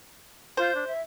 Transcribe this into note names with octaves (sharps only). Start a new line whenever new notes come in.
F4 C5 G6
D4
E5